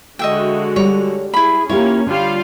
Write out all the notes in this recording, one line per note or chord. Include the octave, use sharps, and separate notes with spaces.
D3 G#3 F#4 D#5 E5 G5
G3 C#5
E4 G#4 B5
A#3 C#4 E4 F4 G4 C#5
D3 G3 F4 F5